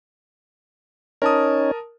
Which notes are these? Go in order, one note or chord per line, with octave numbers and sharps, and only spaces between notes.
C#4 D#4 A#4 C#5 A5 D#6